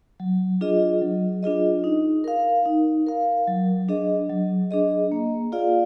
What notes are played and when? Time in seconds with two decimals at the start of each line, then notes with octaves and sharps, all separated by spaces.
0.20 F#3
0.61 D4 F4 G#4 D#5
1.02 F#3
1.43 D4 F4 G#4 D#5
1.84 D#4
2.24 A#4 F5
2.66 D#4
3.07 A#4 F5
3.48 F#3
3.89 D4 G#4 D#5
4.30 F#3
4.71 D4 G#4 D#5
5.12 A#3
5.52 F4 G#4 D5 F5